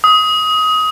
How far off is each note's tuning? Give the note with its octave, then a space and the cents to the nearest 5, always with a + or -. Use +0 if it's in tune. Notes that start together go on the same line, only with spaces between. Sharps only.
D#6 +20